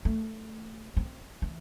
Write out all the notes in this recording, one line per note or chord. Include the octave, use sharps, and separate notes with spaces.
A3
C4
E3